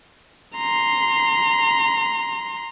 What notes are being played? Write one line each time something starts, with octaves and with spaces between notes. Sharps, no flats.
A#5 C6